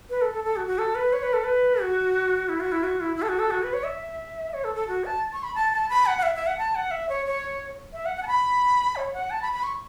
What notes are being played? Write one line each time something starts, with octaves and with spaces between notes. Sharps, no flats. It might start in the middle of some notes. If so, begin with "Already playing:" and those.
B4
A4
A4
A4
F#4
F#4
A4
B4
C#5
B4
A4
B4
F#4
E4
F#4
E4
F#4
E4
E4
A4
F#4
A4
F#4
B4
C#5
E5
C#5
A4
A4
F#4
A5
C#6
B5
A5
A5
B5
F#5
F#5
E5
E5
F#5
A5
F#5
E5
C#5
C#5
E5
F#5
F#5
A5
B5
C#5
F#5
A5
B5
B5
C#6